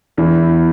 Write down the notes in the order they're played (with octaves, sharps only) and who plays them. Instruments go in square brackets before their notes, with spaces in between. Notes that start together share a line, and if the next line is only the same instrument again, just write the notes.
[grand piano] E2 [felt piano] E3